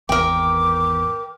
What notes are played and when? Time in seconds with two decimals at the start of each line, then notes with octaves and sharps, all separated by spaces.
0.09 G#1 E2 A#4 G5 D6